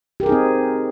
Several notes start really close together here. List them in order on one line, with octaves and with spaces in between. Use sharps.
G4 A#4 G#4 D#4 C4